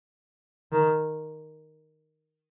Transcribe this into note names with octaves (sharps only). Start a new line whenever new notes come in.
D#3